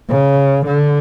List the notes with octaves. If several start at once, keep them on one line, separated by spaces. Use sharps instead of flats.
C#3
D3